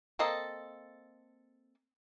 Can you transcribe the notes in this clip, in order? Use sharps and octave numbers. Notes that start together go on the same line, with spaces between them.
A#3 C4 A4 D#5